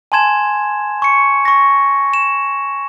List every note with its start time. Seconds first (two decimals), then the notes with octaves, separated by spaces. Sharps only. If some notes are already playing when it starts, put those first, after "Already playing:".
0.12 G#5 A5 C6 G#6 E7
1.02 C#6 C#7
1.45 C#6 A#6
2.14 E7